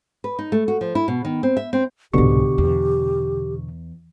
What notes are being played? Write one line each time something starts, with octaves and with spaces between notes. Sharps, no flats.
B4
D#4
A3
F#4
F3
E4
B2
D#3
C4
E5
C4
C2 G#2 B2 D3 G4 C#6
E2